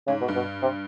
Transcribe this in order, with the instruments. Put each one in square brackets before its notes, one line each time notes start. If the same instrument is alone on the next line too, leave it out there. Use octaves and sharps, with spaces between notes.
[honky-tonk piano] G#2 [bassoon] C#3
[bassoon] B2
[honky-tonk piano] G2
[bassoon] B2
C3